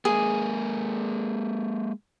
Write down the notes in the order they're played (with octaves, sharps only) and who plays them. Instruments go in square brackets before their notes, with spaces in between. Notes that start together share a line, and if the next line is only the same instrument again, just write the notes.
[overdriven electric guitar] G#3 A#3 [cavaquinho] G#4